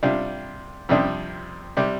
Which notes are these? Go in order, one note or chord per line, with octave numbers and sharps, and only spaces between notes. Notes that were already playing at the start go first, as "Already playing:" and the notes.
C3 G3 D4 F4
F2 C3 G3 D4
C3 G3